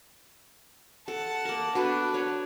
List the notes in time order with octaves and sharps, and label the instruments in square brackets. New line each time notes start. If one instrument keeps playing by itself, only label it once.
[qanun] A4 [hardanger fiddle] F#5 A5
[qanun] A#3 A#4
[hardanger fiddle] B3 D4 [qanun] F#4 A4 B4
[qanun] C#5